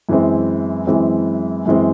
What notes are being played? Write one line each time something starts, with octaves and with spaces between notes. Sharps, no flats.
F#2 E3 G#3 C4
F#2 E3 G#3 C4
F#2 E3 G#3 C4